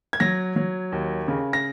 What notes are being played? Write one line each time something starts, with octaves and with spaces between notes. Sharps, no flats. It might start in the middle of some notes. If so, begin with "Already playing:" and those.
G#6
F#3 A#6
F#3
D#2
C#3
A#6